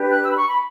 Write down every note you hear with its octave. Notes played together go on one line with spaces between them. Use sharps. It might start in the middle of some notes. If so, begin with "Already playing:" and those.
Already playing: D4 G4 B4
F#6
E6
B5
C#6
B5